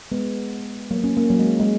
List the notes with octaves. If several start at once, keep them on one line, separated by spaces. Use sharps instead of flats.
G#3 B3
F#3 A#3
A#3 C#4
A#3 C#4
F#3 A#3
G#3
G#3